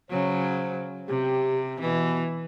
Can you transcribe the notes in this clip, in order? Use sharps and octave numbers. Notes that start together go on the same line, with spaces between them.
C#3 F#3 C5
C3 G4
B2 E3